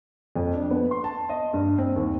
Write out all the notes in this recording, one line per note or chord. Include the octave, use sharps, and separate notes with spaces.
F2
D4
B3
C6
A5
D#5
G2
C4
D#2